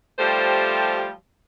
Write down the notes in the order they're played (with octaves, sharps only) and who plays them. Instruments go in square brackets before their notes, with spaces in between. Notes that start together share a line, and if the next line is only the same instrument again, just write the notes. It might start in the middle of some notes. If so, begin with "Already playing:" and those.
[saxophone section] F3 G3 A3 G4 C5